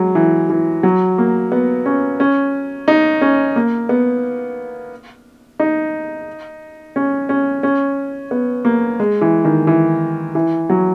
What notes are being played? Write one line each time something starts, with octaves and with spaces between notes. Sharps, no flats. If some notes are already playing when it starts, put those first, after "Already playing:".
Already playing: F#3 G#3
E3
E3
F#3
A#3
B3
C#4
C#4
D#4
C#4
A#3
B3
D#4
C#4
C#4
C#4
B3
A#3
G#3
E3
D#3
E3
E3
F#3